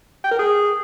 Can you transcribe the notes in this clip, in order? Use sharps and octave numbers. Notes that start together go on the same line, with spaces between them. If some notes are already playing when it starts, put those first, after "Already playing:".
G5
A#4
G#4